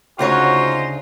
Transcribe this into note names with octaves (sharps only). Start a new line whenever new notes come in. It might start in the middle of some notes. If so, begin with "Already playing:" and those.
D2 C#3 D#4 F4 F#4 C5 C#5